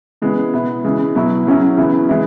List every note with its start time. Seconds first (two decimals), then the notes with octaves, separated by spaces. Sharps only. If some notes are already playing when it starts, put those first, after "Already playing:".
0.22 C#3 E3 G#3 B3
0.53 B2 B3 E4
0.84 C#3 E3 G#3
1.15 B2 F#3 B3 E4
1.47 C#3 F#3 C#4 E4
1.77 C#3 E3 B3 E4
2.09 E3 G#3 E4